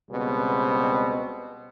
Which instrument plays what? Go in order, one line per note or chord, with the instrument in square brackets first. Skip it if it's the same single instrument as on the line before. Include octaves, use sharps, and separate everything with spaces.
[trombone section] C#2 B2 G3 B3 C4